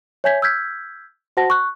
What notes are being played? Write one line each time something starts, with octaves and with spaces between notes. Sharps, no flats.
C#5 E5 G#5 G6 G#6 B6
E6 F6 G6 G#6 B6
F#4 C5 F#5 A5 A#6
C#6 F#6